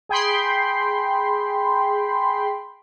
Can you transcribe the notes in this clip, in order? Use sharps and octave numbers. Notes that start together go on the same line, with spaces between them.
G#4 G5 B5 C6